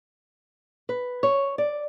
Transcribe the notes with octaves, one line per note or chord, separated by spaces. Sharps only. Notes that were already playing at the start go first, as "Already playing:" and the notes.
B4
C#5
D5